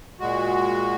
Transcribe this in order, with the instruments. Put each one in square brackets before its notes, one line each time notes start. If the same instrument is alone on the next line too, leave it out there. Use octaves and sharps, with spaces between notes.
[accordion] A#2 G#3 F#4